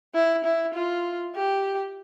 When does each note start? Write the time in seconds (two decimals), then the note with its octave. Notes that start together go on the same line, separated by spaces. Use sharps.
0.14 E4
0.44 E4
0.74 F4
1.36 G4